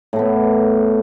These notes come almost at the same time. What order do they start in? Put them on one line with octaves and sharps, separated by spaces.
A2 A3 B3